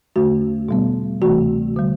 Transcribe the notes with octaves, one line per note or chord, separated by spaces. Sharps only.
E2 D3 A3 F#4
B2 G3 B3
D2 C3 E3 A3 F#4
D3 G3